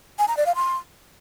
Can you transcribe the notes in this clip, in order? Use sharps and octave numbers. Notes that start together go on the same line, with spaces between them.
G#5
A#5
D5
F5
C6